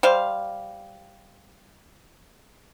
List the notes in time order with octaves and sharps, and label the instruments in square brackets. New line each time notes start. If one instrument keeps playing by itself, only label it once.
[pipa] G3 C5 F5